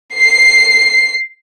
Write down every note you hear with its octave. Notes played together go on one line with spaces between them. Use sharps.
C7